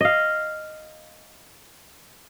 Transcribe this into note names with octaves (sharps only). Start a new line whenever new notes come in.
D#5 F5